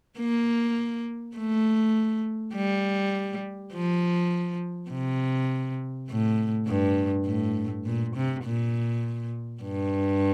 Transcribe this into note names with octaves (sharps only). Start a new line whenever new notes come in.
A#3
A3
G3
F3
C3
A2
G2
A2
A#2
C3
A#2
G2